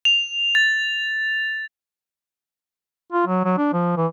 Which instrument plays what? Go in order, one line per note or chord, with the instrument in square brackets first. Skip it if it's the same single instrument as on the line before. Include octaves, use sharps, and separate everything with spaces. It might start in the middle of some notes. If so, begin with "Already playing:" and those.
[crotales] F7
A6
[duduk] F4
F#3
F#3
D4
F3
E3